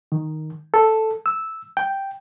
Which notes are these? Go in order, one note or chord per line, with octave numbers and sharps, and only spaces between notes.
D#3
A4
E6
G5